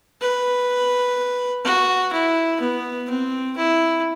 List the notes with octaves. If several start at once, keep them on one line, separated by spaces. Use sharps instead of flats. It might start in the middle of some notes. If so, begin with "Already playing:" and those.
B4
F#4
E4
B3
C4
E4